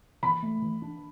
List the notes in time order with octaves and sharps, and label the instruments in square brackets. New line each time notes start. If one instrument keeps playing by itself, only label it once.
[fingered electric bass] E3 [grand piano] B5
[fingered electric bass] A3
E3
D4